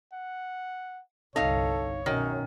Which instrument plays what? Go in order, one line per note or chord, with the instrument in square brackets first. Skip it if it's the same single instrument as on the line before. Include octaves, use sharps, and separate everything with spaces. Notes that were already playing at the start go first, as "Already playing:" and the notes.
[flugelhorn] F#5
[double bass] G1 C2 [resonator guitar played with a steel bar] D#4 F5 [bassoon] A4 [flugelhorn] C#5
[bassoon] F#2 [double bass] B2 C#4 [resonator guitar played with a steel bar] D#3